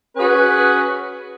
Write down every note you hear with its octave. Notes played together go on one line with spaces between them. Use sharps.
C#4 F#4 G#4 B4